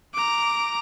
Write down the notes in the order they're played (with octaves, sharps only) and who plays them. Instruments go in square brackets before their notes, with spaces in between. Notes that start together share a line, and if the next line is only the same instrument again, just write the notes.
[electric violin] A#5 D6